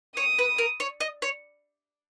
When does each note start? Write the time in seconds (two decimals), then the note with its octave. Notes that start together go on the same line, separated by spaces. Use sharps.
0.16 C#5 D#6
0.39 B4
0.58 A#4
0.80 C#5
1.00 D#5
1.22 C#5